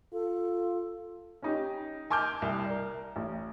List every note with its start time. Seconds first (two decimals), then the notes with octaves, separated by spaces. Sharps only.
0.13 F4 A4
1.42 C#4 D#4 G4
2.10 G#5 A5 D6 F6 G6
2.42 C2
2.66 A#4 D5
3.16 A1